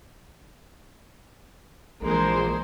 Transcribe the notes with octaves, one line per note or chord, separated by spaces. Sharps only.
A#1 E3 G#3 A#3 G#4 C5